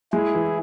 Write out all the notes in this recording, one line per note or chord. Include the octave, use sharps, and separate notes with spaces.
G#3 E4 G#4
E3